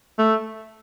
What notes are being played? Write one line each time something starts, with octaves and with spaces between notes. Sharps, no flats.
A3